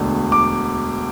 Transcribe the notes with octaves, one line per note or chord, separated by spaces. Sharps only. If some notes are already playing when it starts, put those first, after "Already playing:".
Already playing: E1 D2 D3
D6